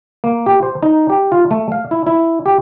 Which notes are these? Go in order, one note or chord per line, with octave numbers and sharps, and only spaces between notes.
A#3
G4
C5
D#4
G4
F4
A3
F5
E4
E4
G4